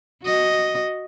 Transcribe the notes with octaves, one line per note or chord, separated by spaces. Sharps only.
F#4 D#5